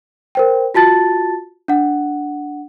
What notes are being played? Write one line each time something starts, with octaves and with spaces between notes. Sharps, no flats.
A#4 C5 G5
F4 F#4 A5 A6
D4 F#5